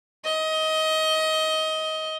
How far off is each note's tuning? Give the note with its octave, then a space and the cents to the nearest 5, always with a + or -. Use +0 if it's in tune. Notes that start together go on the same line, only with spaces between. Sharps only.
D#5 +20